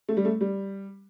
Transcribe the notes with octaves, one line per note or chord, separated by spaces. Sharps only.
A3
G3
A3
G3